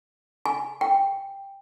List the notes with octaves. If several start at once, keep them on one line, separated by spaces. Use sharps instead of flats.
G#5
G5